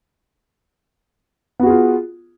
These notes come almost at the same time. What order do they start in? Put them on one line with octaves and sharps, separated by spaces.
B3 F#4 G#4 F4